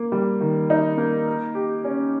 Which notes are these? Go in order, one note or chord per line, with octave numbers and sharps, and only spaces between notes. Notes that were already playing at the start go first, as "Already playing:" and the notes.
Already playing: A#3
G3
D#3
D#4
A#3
A#4
G4
C#4